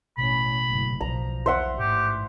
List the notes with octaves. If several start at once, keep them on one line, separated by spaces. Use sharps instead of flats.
A1 B2 C#4 B5
F#1 A2
B1 B2 F3 A#5
E2 C5 E5 F#5
A1 G#2 G4